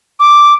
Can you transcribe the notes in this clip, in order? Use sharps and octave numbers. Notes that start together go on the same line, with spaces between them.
D6